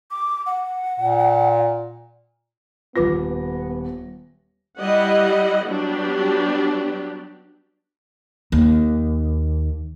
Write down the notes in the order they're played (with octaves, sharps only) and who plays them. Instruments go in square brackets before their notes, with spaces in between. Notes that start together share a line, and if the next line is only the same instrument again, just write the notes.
[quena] D6
F#5
[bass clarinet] A#2
[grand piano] D#1 A#6 [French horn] B3 [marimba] F4 B4 D6
[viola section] G3 E4 D#5 F#5
F#3 G3 B3 D4 G4
[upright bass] D#2